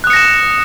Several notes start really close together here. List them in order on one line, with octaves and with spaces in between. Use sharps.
F#6 D#6 C#7 A#6 E7